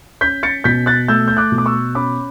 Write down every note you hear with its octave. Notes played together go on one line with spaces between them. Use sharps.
C#4 G6 B6
A6 C#7
B2 G6 B6
F#6 A6
A3 E6 G6
G6
D6 F#6
B2
D6
C#6 E6
C#4 B5 D6